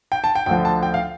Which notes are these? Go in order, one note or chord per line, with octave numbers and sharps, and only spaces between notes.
G5
A5
G5
D2 D3 F3 G5
A5
G5
F5